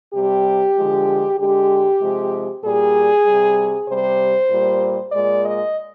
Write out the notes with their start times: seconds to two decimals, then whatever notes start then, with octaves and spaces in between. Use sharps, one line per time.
0.14 C3 G3 G4
0.76 D3 F3 G#3
1.39 D3 G#3 G4
2.01 C3 F3 G#3
2.63 A#2 G3 G#4
3.26 C3 G3
3.88 C3 G3 C5
4.50 A#2 G3
5.11 A#2 G#3 D5
5.44 D#5